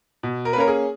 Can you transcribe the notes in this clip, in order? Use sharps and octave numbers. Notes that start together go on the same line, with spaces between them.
B2
A#4
B4
A#3 C#4 A#4
G#4